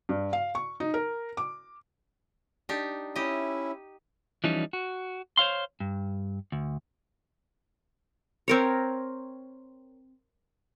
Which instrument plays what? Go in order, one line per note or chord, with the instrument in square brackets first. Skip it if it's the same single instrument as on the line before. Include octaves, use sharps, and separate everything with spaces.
[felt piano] G2
F5
C#6
D#4
A#4
D6
[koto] D4 D#4 G4
[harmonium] C#4 E4 E5 [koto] G4 D#5
[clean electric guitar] E3 F3 G3 C#4 D#4
F#4
C5 C#5 F5 C6
G2
D2
[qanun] C4 A#4 C#5